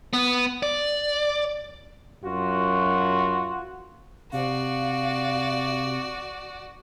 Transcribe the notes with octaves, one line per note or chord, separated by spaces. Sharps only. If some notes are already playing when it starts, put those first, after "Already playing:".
B3
D5
F#2 F4 F#4
C3 F#4 D5 F5